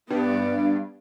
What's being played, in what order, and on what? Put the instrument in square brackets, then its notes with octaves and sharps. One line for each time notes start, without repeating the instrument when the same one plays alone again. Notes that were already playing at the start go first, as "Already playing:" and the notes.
[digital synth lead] G2 [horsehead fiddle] B3 D5